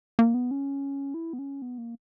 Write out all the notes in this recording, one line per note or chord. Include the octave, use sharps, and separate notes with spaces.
A#3
B3
C#4
E4
B3
C#4
B3
A#3